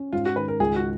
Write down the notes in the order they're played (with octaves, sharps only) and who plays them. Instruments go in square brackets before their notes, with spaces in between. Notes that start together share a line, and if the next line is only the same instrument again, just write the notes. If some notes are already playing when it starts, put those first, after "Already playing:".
Already playing: [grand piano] C#4
[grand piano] G#2 [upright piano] F4
[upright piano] F#4
[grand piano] D#3 [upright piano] B4
[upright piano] A#4
[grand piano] C#2 [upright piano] G#4
[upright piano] F#4